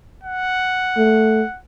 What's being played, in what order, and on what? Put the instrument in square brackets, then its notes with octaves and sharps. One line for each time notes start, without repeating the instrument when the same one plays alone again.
[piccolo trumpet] F#5
[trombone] A3